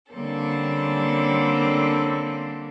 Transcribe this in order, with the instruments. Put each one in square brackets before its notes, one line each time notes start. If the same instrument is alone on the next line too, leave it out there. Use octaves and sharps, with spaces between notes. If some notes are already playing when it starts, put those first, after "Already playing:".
[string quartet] D3 G3 A#3 C4 C#4 A4